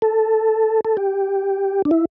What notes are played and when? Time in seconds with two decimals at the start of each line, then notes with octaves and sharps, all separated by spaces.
0.02 A4
0.85 A4
0.97 G4
1.85 D4
1.91 E4